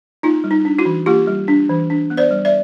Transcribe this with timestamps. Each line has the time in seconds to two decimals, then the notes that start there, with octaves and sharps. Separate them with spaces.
0.23 A#3 D#4 F4
0.44 G3
0.51 D#4
0.65 D4
0.78 E4 F#4
0.85 E3
1.06 A#3 F4 G4
1.28 G3
1.48 D4
1.69 E3
1.90 D4
2.10 B3
2.17 C5 D5
2.31 G3
2.45 D5 E5